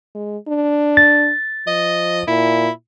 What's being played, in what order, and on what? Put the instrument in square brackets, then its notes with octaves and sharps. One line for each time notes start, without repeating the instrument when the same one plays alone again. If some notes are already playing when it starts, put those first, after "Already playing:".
[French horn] G#3
D4
[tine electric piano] A6
[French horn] F3 [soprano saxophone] D#5
[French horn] A#2 [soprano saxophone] E4